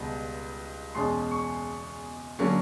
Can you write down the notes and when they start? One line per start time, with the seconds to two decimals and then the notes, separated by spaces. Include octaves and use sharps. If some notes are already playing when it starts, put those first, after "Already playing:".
Already playing: C#2 B2 G3 B3
0.95 E2 B2 G#3 C#4 C6
1.31 C#6
2.39 D3 F#3 A#3 C#4